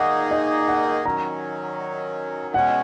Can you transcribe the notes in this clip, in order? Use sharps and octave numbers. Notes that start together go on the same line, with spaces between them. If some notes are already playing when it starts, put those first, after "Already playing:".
Already playing: D#3 A#3 D#4 G#4 F#5
D#5
F#5
D#3 F#3 C#4 A#5
B2 G#3 C#4 F#5